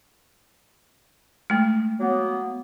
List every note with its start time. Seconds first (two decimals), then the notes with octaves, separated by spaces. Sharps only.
1.50 G#3 A3
2.00 F#3 A#3 B3